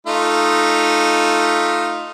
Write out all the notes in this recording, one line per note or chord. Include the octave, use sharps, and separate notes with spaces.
A3 D#4 F4